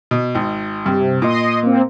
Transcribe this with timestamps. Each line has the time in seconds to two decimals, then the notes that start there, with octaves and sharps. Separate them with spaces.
0.11 B2
0.35 G#1
0.86 G2 C3
1.22 A#2 D#5 C6 D#6
1.63 A#3 C4